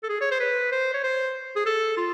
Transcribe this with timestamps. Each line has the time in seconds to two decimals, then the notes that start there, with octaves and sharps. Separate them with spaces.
0.03 A4
0.09 G#4
0.21 C#5
0.31 C5
0.40 B4
0.72 C5
0.94 C#5
1.04 C5
1.56 G#4
1.66 A4
1.97 F4